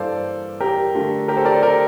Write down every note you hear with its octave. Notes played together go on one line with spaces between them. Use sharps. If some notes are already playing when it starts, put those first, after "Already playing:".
Already playing: G2 E3 A#3 A4 C5 D5 F5
G4 A#4
D3 A3 D4 F4
G4 A#4
A4 C5
A#4 D5
A4
G4 A#4